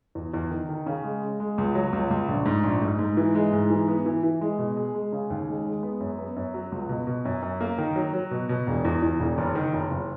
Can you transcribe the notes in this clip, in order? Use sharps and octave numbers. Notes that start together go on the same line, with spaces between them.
E2
E2
D#3
D#3
C#3
G#3
G#3
G#3
C#2
F#3
C#2
C#2
A#1
G#2
A#1
G#2
G#2
E3
G#3
G#2
E3
B3
E3
E3
G#3
B2
G#4
G#3
C#3
D#2
G#3
G#3
B3
F#2
B3
F#2
F#3
C#2
B2
B2
F#2
F#2
A#3
D#3
F#3
F#3
B2
B2
E1
E2
E2
E1
F#1
D#3
F#1
F#1